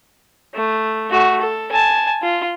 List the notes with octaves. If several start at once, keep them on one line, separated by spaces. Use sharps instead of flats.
A3
A3 F#4
A4
G#5 A5
F4